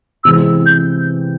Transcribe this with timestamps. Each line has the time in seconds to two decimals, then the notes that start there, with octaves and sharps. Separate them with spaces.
0.24 C3 E3 G#3 C4 E4 E6
0.66 G6